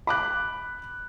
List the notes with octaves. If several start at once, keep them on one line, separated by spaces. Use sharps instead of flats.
B5 D6 F#6